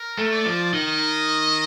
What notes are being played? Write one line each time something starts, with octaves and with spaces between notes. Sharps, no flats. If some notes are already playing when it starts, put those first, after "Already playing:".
Already playing: A#4
A3
D5
F3
D#3 D#5